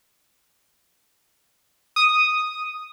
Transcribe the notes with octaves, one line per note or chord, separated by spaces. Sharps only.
D#6